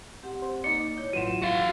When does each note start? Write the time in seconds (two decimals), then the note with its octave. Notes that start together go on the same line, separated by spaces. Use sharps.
0.23 C4 G4 F#5
0.42 C5
0.64 A#3 D#4 D5 C#7
0.98 E4 C#5 G6
1.13 A1 E3 F#3 F4 F#5 C6 D#7 E7
1.42 F#4 F5